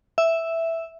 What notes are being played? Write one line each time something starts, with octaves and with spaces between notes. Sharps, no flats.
E5